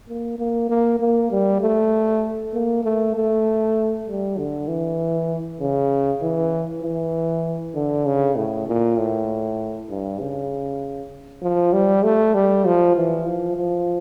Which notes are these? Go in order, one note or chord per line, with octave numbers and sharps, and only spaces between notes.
A#3
A#3
A#3
A#3
G3
A3
A#3
A3
A3
G3
D3
E3
C#3
E3
E3
D3
C#3
A2
A#2
A2
G2
C#3
F3
G3
A3
G3
F3
E3
F3
F3